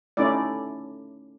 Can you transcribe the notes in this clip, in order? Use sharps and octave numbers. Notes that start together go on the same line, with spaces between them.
A3 C#4 D#4 E4 D5